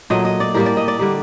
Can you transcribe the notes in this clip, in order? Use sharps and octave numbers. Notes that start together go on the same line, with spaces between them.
A#2 F#3 A3 D#5
D#5
D5
A2 G3 A#3 A#4
D5
D#5
D5
D3 G3 A#3